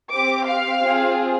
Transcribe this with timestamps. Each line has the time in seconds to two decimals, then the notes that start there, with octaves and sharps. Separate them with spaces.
0.12 C4 G4 D6
0.47 F5
0.81 C4 F4 G#4